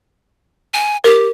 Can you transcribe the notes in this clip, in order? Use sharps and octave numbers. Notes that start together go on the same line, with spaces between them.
G#5
G4 A#4